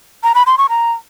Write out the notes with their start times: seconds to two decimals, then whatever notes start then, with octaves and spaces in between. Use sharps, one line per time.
0.23 A#5
0.35 B5
0.46 C6
0.58 C#6
0.69 A#5